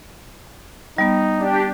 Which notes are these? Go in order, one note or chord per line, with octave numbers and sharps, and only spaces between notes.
G3 B3 D#4
D4 G4